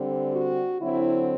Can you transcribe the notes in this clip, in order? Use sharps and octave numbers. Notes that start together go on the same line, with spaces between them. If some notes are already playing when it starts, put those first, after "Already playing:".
Already playing: D3 G3 C4
F#4
D3 F#3 C4 E4